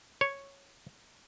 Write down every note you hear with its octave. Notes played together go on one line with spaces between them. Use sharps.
C#5